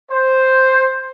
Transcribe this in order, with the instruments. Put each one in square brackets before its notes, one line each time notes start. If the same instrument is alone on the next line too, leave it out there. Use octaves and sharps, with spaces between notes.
[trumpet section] C5